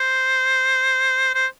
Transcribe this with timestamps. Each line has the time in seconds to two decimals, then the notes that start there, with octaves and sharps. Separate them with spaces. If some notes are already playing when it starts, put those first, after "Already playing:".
Already playing: C5
1.35 C5